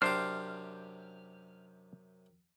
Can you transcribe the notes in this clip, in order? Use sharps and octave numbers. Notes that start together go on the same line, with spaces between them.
F#2 C3 D4 G4 C5 F6